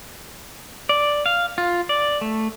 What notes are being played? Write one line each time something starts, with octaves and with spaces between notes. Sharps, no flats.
D5
F5
F4
D5
A3